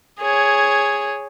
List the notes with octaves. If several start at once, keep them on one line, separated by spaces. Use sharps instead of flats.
G#4 C#5